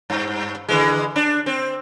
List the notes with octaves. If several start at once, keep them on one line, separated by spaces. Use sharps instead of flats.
G2
D3 E3 G#3
D4
C4